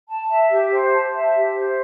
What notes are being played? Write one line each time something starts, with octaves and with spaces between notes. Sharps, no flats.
A5
E5
G4
C5
A5
E5
G4
C5